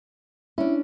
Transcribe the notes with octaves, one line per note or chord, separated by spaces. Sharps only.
C#4 D4 E4